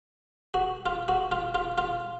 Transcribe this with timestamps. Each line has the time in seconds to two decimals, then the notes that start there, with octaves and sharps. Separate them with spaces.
0.54 F#4
0.86 F4
1.08 F#4
1.31 F4
1.55 F4
1.78 F4